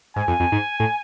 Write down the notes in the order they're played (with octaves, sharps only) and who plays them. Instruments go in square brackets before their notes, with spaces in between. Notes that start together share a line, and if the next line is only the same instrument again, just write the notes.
[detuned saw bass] G#2 [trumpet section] G#5
[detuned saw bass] F2
F2
G#2
A2